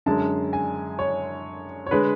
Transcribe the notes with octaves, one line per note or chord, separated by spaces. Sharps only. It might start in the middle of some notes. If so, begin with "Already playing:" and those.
F#2 D3 G#3 A5
G#5
C#5
C#5
D3 G#3 B4